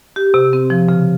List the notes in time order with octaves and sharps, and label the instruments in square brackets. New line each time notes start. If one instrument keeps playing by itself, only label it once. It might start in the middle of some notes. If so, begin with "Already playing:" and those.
[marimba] G4
C3
C4
F3
C#3